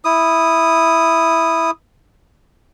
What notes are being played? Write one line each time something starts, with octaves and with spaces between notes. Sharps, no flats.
E4 D#6